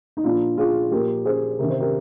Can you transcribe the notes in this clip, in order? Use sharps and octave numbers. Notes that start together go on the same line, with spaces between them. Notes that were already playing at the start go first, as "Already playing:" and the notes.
D#4
A#2 F3 D4 F4
F4 G#4
A#2 F3 G4 A#4
G#4 C5
C3 D#3 A#4
C5
G4 A#4